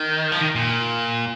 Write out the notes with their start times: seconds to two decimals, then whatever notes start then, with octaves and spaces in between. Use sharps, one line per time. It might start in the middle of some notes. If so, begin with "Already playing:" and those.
Already playing: D#3
0.32 F3
0.39 D#3
0.55 A#2